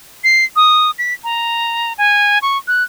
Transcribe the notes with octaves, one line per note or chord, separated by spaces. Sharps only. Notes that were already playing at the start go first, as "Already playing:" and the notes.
C7
D#6
B6
A#5
G#5
C#6
F#6